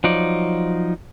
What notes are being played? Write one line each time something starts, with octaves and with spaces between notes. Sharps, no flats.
F3 F#3 D#4 D5